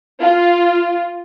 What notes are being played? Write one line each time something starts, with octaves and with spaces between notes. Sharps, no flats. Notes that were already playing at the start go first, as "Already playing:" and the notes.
F4